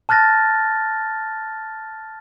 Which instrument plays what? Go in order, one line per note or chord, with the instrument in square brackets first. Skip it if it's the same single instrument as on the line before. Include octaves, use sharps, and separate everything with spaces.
[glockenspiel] A5 F6 F#6 A6 A#6